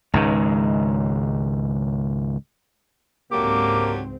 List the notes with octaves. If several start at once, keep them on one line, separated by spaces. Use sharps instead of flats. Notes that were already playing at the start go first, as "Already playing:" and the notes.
C#2 G#2 D#3
C#2 G#2 D3 F#3 A#3 C4 G4 D6